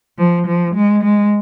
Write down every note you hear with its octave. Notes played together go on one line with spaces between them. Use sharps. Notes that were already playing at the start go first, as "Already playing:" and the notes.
F3
F3
G#3
G#3